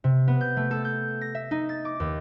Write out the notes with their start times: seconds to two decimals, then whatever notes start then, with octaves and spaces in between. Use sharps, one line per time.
0.04 C3
0.28 B3
0.41 G6
0.57 A3
0.71 A4
0.85 G6
1.21 A#6
1.35 E5
1.51 D#4
1.69 A6
1.85 D6
2.00 D#2